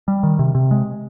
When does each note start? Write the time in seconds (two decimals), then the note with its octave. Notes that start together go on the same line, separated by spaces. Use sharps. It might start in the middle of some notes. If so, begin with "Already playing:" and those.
0.08 G3
0.23 D#3
0.39 C3
0.55 C3
0.71 G#3